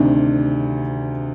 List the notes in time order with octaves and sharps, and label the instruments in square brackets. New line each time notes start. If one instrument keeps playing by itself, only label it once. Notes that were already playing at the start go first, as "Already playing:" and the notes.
Already playing: [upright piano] D2 C3 D#3 D4